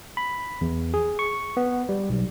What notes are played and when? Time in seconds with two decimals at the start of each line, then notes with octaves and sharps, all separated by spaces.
0.17 B5
0.61 E2
0.94 G#4
1.19 C#6
1.57 B3
1.89 G3
2.09 B1